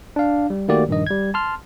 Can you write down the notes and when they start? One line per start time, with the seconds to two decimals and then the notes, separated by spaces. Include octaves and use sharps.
0.16 D4 F5
0.50 G3
0.68 D#3 A3 A#3 F#4 G4 D5
0.88 A#1 G2 D#3 D#5
1.07 G3 G#6
1.34 A5 C6 F6